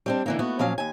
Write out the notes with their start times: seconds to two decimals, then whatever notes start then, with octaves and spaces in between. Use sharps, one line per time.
0.06 G3 C4 D4
0.26 D3 E3 A#3
0.39 A3 B3 F#4
0.59 A#2 F3 F#3 C#4 F5
0.78 D#2 G#5